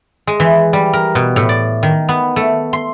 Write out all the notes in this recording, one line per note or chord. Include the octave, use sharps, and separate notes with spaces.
G#3
E3
G3
A#4
B2
A2
D5
D#3
B3
A3
C6